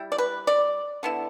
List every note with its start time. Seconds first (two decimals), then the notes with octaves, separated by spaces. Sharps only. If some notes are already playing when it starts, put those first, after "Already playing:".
Already playing: G3 E4
0.12 D5
0.18 B4
0.47 D5
1.03 D3 B3 E4